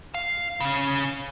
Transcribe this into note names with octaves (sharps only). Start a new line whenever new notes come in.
F5
C#3 C#4